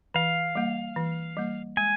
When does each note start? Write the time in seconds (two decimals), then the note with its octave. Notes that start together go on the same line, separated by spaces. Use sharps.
0.14 E3 F5
0.55 G3 A#3
0.96 E3
1.37 G3 A#3
1.77 G#3 G#5